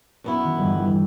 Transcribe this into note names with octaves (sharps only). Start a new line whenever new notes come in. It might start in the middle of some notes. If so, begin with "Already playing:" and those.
F#2 B3 E4 A5 C#6
D#3
G1 E2 G2
E2